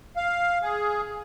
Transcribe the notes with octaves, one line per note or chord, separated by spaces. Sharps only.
F5
G#4